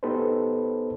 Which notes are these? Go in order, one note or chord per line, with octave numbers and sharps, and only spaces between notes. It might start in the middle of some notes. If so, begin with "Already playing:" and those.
B3 D#4 G4 A4 B4 C5